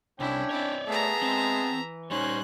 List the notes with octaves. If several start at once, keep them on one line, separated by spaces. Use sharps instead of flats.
C2 C#4 D4 E4 G5
C4 E4 C#5 D5
A3 B3 G#4 E5 A5 A#5
G#3 C4
E3
G3 C#4 D#4 C5 C#5 G#5 F#6